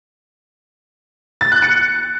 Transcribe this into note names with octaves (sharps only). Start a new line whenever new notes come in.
A6
F#6
C#7